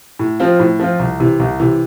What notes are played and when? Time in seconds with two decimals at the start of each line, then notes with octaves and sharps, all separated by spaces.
0.19 A2
0.40 F3 C4 F4
0.60 A2
0.79 F3 C4 F4
0.99 C2
1.20 C3 E3
1.40 C2
1.60 C3 E3